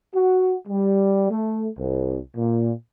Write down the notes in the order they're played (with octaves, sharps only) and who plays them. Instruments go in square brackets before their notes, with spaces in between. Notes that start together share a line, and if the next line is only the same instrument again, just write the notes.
[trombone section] F#4
G3
A3
C2
A#2